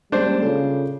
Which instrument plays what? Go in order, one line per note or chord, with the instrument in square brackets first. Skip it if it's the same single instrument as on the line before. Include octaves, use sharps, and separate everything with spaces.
[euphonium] G3 [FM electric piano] G#3 A#3 C#4 [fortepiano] D4 C5
[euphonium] C#3 [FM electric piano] F4 A4